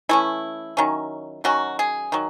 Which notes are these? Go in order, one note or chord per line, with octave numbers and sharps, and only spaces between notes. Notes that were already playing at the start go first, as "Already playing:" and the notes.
E3 A3 C#4 E4
D#3 F#3 C#4
D#3 F#3 C#4 F#4
G#4
D#3 F#3